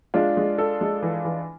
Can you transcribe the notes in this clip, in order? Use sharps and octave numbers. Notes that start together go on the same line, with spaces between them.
G#3 D4 F4
G#3
A4
G#3
E3
E3